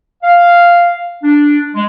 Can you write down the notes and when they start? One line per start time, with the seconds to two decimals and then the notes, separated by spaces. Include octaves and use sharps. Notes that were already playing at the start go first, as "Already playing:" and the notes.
0.23 F5
1.24 D4
1.75 G#3